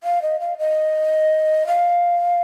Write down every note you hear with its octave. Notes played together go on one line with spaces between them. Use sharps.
F5
D#5
F5
D#5
F5